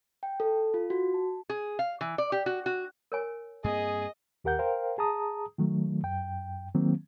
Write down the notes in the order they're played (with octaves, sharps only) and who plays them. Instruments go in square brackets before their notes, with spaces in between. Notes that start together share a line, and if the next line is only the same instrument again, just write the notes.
[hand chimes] G5
A4
F4
F#4
A5
[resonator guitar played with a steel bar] G#4
F5
E3
D5
G4
F#4
F#4
[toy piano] A#4 C#5 G#5
[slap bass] G2 A#3 C4 [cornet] G#4 [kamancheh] D#5
[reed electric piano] D#2 G4 A#4 F#5 G6
A#4 C5 F5 G5
G#4 A5 A#5 D#6
D#3 F#3 A3
F#2 G5
D#3 F#3 A#3 C4